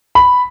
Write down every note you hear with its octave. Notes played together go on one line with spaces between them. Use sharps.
B5